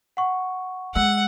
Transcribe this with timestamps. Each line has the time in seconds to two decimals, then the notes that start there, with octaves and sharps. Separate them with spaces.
0.17 F#5 C#6
0.95 G#3 F#5 E6